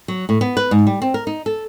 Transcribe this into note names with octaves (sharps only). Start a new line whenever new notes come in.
F#3
A2
B3
B4
G#2
G3
C4
A#4
D#4
A4